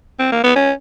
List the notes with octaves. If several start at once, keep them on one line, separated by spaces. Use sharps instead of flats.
C4
A#3
B3
C#4